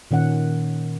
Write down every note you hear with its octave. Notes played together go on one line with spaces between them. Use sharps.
A#2 D#3 C#4 F#5